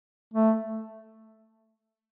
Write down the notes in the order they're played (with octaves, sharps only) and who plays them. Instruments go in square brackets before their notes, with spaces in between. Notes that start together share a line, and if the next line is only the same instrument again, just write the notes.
[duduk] A3